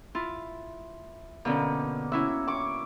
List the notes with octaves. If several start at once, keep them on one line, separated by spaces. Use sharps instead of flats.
E4 F4
B2 D3 A#3 C#4
C#4 E4 F#4 E5
C#6 D6